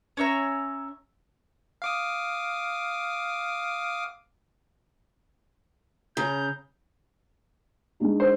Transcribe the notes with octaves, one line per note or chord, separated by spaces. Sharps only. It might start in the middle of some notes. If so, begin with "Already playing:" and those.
C#4 C#5 E5 A#5
F5 D6 D#6
C#3 A#5 G6
G#3 D4 D#4
C5